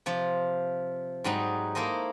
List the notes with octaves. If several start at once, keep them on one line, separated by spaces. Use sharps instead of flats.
C3 F3 F4
G#2 F#3 G3 D#4
A#3 E4 A4 C5 D#5